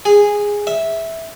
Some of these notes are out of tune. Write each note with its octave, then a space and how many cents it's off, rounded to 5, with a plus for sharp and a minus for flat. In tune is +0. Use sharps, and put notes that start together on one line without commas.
G#4 -10
E5 -10